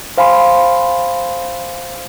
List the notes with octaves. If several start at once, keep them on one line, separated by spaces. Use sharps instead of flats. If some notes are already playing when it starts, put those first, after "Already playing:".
C5 F5 G#5 B5 C6